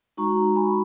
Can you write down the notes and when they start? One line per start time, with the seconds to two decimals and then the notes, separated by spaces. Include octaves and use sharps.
0.17 G#3 D#4 F#4 A#5 C#6
0.56 G#5 B5